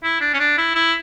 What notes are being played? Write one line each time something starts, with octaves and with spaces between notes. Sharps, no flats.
E4
D4
C#4
D4
E4
E4